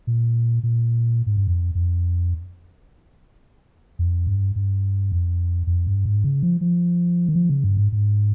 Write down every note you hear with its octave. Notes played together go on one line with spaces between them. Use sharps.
A#2
A#2
G#2
G2
F2
F2
F2
G2
G2
F2
F2
G2
G#2
C#3
F3
F3
D#3
F3
C#3
G2
G#2
G#2